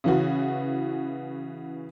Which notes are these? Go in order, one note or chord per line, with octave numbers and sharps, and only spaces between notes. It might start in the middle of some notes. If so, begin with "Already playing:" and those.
C#3 E3 F#4